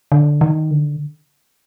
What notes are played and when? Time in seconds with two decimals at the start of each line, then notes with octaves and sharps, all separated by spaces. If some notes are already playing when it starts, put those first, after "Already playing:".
0.12 D3
0.41 D#3
0.71 D3